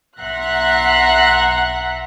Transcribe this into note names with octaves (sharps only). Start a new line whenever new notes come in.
B1 E5 F#5 A#5 C6 F#6